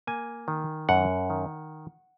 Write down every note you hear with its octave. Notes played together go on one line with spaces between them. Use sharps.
A#3 G#5
D#3
F#2 F#5
D#3